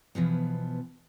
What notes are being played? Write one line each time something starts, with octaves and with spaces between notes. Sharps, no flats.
B2 E3 F3 B3